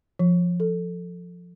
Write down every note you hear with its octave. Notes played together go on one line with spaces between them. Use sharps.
F3
A4